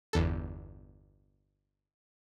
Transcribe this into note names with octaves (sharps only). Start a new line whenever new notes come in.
G1 E2 A4